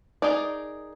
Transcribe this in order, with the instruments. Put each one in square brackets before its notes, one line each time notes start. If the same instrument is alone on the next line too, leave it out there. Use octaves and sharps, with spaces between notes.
[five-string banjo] D#4 G#4 A#4 D5